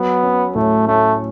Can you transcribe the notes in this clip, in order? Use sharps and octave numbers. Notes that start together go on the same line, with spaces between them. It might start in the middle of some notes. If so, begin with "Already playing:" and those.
Already playing: F#3 B3
C#4
A2 A3
A3 C#4